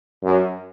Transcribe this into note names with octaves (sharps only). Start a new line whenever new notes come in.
F#2